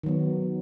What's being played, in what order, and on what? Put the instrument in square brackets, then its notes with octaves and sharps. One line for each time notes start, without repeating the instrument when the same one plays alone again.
[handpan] D#3 F#3 B3